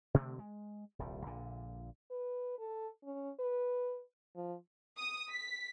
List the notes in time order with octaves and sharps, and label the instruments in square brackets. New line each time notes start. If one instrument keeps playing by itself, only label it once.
[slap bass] B2 D3 A3 C4
G#3
D#1 C2 G3
A#1 A#2 D3
[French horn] B4
A4
C#4
B4
F3
[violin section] D#6
B6